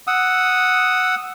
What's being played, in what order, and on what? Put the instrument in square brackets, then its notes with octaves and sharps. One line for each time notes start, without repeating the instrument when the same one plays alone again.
[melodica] F#5 D#6 E6